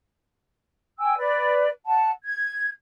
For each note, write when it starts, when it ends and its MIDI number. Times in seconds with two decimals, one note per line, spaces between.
0.99 1.14 79
0.99 1.14 80
0.99 1.14 88
1.17 1.68 71
1.17 1.68 74
1.86 2.10 78
1.86 2.10 81
2.23 2.68 92